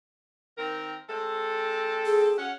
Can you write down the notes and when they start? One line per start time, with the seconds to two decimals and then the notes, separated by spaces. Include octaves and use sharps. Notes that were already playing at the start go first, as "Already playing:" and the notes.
0.58 D#3 C4 A#4
1.09 G#3 C4 A4
2.06 G#4
2.38 C#4 F5 F#5